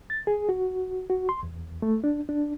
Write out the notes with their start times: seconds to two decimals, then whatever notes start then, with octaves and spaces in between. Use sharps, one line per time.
0.10 A6
0.27 G#4
0.49 F#4
1.10 F#4
1.29 C6
1.43 E2
1.82 A3
2.04 D4
2.29 D4